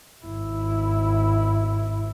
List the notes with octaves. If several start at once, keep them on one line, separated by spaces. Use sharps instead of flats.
G#1 E4